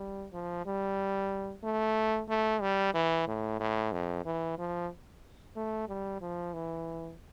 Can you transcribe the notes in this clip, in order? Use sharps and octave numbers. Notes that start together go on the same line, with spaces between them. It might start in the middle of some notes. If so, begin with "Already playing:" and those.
Already playing: G3
F3
G3
A3
A3
G3
E3
A2
A2
F2
E3
F3
A3
G3
F3
E3